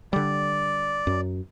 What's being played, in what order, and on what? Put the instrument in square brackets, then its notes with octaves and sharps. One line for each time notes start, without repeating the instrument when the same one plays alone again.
[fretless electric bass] D3 G3 [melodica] D5
[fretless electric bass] F#2